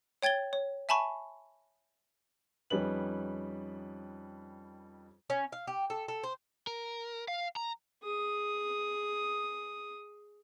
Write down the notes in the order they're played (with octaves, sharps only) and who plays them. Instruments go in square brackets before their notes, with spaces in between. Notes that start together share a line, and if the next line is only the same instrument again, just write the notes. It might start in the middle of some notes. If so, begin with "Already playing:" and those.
[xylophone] C#5 G5 G#6 A6 G7
C#5
E5 G#5 A5 B5 C#6
[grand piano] F2 G3 C#4 D#4 B4 F#7
[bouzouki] C#4
F5
G4
A4
A4
C5
[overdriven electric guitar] A#4
F5
A#5
[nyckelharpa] G#4 D#6